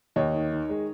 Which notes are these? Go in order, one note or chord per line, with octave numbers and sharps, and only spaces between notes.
D#2 C#5 D#5
D#3
D#3
G#3